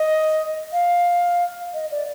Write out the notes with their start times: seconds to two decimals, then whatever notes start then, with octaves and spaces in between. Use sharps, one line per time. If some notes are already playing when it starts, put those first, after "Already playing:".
Already playing: D#5
0.73 F5
1.74 D#5
1.91 D5